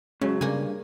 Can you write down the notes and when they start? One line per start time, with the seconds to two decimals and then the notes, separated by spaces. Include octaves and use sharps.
0.21 G#2 C#3 F#3 C#4
0.41 C2 G2 C#3 A#3 G#5